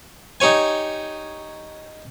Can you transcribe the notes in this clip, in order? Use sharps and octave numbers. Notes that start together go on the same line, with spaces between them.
D#4 G4 C#5 G#5